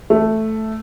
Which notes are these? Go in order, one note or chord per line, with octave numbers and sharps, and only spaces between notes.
A3